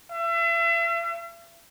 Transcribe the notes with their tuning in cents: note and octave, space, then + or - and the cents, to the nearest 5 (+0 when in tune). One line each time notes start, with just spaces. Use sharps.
E5 +40